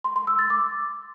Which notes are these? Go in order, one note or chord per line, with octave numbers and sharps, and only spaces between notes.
C6
C6
E6
A6
D6